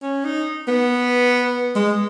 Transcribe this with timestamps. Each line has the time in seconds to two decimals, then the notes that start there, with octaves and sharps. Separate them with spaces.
0.02 C#4
0.25 D#4
0.68 B3
1.76 G#3